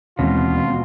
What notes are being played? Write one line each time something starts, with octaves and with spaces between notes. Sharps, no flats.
D#2 B2 E3 G#3 C4 C#4 F4